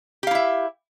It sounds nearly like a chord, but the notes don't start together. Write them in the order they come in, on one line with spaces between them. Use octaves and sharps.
G4 F5 E4 E5